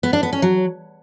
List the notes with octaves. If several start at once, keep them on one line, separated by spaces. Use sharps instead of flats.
B3
D4
B3
C#4
F#3